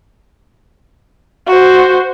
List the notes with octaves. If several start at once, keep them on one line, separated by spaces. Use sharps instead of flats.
F#4 C5